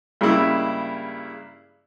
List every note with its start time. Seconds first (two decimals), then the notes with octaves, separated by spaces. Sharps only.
0.21 G2 C#3 G#3 A#3 E4